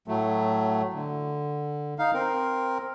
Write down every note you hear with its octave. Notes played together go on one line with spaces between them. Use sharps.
A2 F#3 A3
D3
D#4 F5
C4 A#4